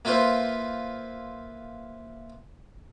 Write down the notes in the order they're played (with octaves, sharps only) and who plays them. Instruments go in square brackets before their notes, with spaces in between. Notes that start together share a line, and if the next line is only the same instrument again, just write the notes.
[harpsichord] A#3 E4 F4 B4 C5